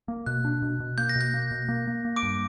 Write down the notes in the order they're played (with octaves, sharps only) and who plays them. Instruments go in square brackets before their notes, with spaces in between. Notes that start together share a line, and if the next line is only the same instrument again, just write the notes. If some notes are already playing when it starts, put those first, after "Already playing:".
[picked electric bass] A#3
[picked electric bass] B2 [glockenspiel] F#6
[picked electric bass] D4
B2
B2
[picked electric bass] A#3 [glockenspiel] G6
[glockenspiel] A#6
[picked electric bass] B2
[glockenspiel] G6
[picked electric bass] A#3
B2
A#3
A#3
A#3
[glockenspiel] D6 D7
[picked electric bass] G2